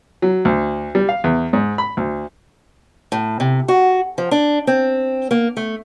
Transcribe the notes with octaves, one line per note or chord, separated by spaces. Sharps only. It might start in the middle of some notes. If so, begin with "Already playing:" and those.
F#3
D2
G3
F5
E2
G#2
B5
D2
A2
C3
F#4
F3
D4
C4
A#3
A3